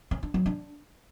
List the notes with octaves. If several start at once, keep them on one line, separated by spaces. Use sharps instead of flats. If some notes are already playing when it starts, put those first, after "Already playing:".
C#4
D4
F#3
D4